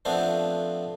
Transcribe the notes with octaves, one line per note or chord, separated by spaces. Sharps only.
F3 A3 B3 C4 D4